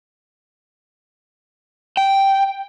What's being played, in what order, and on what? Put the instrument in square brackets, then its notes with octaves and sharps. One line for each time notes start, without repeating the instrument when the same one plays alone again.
[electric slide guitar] G5